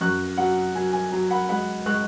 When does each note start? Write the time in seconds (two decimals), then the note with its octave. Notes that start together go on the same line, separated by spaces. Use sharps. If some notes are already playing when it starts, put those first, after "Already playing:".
0.01 F#2 C#6 F#6
0.38 F#3 F#5
0.75 F#3 G#5
0.93 G#5
1.12 F#3 G#5
1.30 F#5 B5
1.49 G#3 F#5 B5
1.86 G#3 C#6 F#6